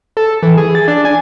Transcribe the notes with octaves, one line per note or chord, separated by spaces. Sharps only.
A4
E3
G#4
A6
D4
G#5